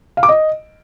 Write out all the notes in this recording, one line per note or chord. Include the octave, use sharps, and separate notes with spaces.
F5
D6
D#5